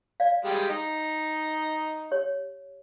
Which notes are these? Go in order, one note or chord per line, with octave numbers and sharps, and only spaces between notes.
D5 F5
G3 G#3 G4
D#4
G4 C#5